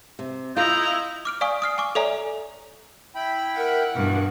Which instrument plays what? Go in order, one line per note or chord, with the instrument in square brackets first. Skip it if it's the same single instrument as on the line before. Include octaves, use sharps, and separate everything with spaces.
[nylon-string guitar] C3
[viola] E4 A#5 [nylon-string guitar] F4 [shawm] D#5 [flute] G6
[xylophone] D6 F6 D7
D5 F5 G#5 C#6 D#6
D#6 F6 C7
G#5 C#6 D6
A4 C#5 D5 E5 G#5 A#5
[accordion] E4 G5 B5
[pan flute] A#4 [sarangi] F#5
[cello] G2 B2 [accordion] E3